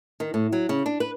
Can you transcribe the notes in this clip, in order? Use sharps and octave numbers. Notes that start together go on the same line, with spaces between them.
D#3
A2
F#3
C#3
D4
B4